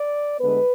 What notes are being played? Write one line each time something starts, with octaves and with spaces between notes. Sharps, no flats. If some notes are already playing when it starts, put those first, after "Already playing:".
Already playing: D5
D2 D3 G#3 B3 B4